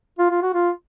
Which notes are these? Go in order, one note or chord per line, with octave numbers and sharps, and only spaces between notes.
F4
F4
F#4
F4